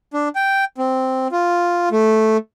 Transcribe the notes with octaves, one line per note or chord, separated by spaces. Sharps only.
D4
G5
C4
F4
A3